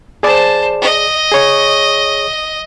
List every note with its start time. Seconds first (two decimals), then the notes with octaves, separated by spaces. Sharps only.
0.23 G#4 C5 D5 A5
0.81 D#5
1.32 G#4 C#5 C#6